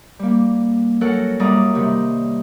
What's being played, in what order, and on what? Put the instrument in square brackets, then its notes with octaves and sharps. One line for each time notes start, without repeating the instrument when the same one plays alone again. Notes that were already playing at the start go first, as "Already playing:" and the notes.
[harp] G3 A#3
F#3 C#4 A4 A#4 F#5
F#2 G3 A#3 D5 A#5 D#6
C3 D#3 G3